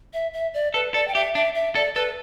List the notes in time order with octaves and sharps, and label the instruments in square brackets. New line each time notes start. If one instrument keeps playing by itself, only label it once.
[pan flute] E5
E5
D5
[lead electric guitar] A4 [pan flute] B4
[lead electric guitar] A4 [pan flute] D5
[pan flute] G5
[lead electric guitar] G4 [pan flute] E5
[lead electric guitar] D4 [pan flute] E5
[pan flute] E5
[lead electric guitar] A4 [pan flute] D5
[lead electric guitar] A4 [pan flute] B4